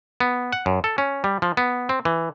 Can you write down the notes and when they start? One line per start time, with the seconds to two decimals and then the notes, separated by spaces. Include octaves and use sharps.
0.20 B3
0.53 F#5
0.66 F#2
0.84 A4
0.98 C#4
1.24 G3
1.42 F3
1.57 B3
1.89 C4
2.05 E3